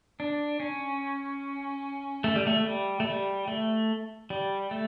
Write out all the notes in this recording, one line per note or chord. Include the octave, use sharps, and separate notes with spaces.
D4
C#4
A3
G3
A3
G3
A3
G3
A3
G3
A3